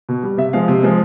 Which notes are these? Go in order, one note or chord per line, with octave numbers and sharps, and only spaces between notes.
B2
G3
C3 E5
F3 G#3 F5
C3
F3 G#3